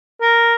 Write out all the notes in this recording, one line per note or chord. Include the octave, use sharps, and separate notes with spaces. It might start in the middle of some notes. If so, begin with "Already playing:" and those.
A#4